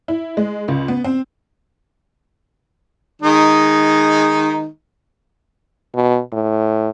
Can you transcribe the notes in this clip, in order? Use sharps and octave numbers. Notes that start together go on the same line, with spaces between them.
E4
G#3
C#2
B3
C4
D#3 G#3 D#4
B2
A2